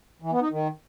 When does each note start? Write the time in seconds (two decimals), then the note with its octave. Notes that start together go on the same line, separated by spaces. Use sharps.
0.22 E3
0.32 B3
0.41 D#4
0.51 D#3